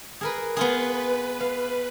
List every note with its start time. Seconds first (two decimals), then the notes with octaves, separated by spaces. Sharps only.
0.21 G#4 A#4 B4
0.57 B3 F4 G#4 B4
1.40 F5